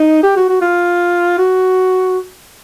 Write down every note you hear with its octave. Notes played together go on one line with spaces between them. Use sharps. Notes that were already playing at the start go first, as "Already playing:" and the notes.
Already playing: D#4
G4
F#4
F#4
F4
F#4